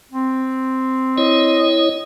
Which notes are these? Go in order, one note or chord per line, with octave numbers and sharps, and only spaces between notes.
C4
E4 C#5 D#5